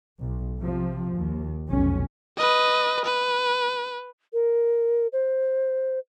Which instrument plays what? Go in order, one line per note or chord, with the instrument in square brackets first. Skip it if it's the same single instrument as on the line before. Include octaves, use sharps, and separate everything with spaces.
[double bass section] B1
C3 F3
D#2
F1 B1 C#4
[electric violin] B4 D#5
B4
[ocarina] A#4
C5